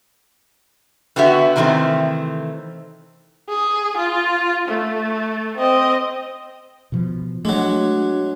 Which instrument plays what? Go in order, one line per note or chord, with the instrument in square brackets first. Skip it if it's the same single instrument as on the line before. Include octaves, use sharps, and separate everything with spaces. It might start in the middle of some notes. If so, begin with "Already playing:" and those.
[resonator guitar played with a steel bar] D3 B3 F#4 G4 E5
C3 D#3 E3 G#3 A3 C4
[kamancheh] G#4
F4
A3
C4 D#5
[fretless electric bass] B2 F3
[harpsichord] F#3 G#3 [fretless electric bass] A3 [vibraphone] D4 F#4